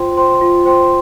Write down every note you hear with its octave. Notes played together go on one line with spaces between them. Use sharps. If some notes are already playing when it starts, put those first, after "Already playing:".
Already playing: F4 C5 G5 C6
C5 G5 C6
F4
C5 G5 C6